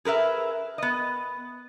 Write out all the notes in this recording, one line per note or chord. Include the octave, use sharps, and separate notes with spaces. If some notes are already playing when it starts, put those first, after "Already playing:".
G#4 A#4 B4 E5
B3 D#5